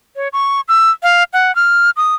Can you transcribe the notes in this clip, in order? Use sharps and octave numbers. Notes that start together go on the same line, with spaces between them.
C#5
C#6
E6
F5
F#5
F6
D#6